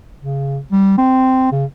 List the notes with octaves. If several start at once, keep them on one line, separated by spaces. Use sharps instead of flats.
C#3
G3
C4
C#3